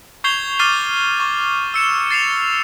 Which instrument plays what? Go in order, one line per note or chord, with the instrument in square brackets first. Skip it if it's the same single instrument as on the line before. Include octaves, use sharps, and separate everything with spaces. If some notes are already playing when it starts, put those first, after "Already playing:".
[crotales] C#6 G6 G#6 C7 F7 G7
D6 F6 A6 C7 D#7 G7
C#6
E6 C#7 E7
A6 C7 E7 F7